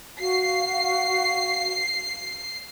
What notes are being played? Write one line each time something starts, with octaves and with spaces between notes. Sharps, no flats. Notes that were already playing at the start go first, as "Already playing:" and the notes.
F#4 F5 C7